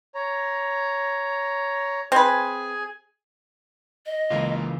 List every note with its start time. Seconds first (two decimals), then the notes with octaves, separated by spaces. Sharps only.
0.15 C#5 A#5
2.12 C4 G#4 B4 G#5
4.06 D#5
4.30 C#2 C#3 E3 A#3 F4 F5